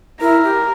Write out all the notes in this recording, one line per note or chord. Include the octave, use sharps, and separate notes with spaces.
E4 A#4
G4